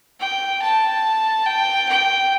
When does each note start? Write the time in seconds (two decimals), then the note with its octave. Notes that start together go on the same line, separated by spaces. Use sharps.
0.20 G5
0.62 A5
1.46 G5
1.88 G5